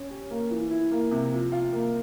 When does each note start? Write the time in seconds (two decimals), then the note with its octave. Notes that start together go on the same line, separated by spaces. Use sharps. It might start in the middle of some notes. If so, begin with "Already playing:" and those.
Already playing: C#4 C#5
0.11 G4
0.31 A#3
0.51 E3
0.71 E4
0.91 A#3
1.11 C3
1.32 F3
1.52 F4
1.73 A#3